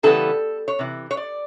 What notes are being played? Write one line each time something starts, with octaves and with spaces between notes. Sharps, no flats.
C#3 E3 G3 B3 A4
C#5
C3 E3
C#5
D5